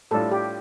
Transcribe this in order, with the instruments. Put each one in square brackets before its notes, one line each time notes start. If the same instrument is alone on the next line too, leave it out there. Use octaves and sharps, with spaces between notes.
[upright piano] A2 G3 D4 F4 [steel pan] A4
[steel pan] G4